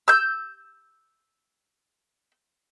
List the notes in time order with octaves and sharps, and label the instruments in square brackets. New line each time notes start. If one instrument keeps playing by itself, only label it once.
[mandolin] E6 G6